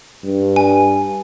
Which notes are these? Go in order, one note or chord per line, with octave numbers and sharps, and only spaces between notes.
G2
G#5